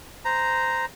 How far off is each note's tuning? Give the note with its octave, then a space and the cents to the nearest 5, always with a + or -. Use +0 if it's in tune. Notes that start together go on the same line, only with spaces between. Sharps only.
C5 -15 A#5 +0